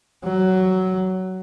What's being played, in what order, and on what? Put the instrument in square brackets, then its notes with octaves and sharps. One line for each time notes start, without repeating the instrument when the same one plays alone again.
[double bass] F#3